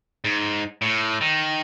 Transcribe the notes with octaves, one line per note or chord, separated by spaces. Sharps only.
G#2
A2
D#3